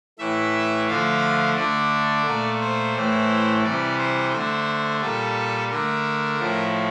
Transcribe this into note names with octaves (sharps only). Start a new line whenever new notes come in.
A2 E3 A3 E5
D3 F3 A3 F5
D3 A3 D5
A#2 A3
C5
A2 E3 A3
C3 E3 G3 D5
C5
D3 A3 C5
A#2 G3 A4
D3 A3 A#4
A2 F3 A3